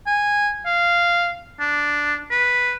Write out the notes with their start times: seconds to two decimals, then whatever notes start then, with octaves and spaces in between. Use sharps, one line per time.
0.07 G#5
0.66 F5
1.60 D4
2.31 B4